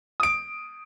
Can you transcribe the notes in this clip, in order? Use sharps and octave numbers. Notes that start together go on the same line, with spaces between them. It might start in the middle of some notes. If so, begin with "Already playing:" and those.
D#6 D7